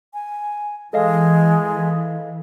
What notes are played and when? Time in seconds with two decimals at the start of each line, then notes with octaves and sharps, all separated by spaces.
0.13 G#5
0.93 E3 G#3 A4 D#5 F5